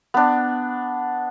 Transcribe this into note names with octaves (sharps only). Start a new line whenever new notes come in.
B3 D4